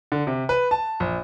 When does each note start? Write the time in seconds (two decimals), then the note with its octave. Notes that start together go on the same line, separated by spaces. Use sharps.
0.12 D3
0.27 C3
0.49 B4
0.71 A5
1.00 A#1